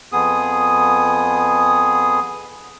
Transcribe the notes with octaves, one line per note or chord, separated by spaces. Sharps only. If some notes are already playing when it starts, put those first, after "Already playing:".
F2 B3 G#4 D#6